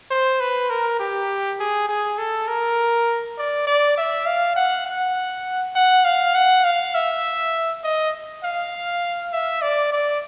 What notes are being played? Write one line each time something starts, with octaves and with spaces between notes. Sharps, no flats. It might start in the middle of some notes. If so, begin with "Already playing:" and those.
C5
B4
A#4
G4
G#4
G#4
A4
A#4
D5
D5
E5
F5
F#5
F#5
F#5
F5
F#5
F5
E5
D#5
F5
E5
D5
D5